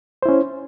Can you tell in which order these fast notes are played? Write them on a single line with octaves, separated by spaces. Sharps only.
C5 E4 C#4